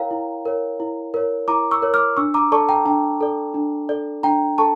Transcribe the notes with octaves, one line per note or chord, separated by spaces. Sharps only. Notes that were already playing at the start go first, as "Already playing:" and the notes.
Already playing: E4 A#4 C#5 F5 G5 A#5
E4
A#4 C#5
E4
A#4 C#5
E4 A#5 D6
C#6 E6
A#4 C#5
D6 F6
D4 C#6 E6
A#5 D6
A4 D5 A5 C#6
G5 A#5
D4 G5 A#5
A4 D5
D4
A4 D5
D4 G5 A#5
A4 A5 C#6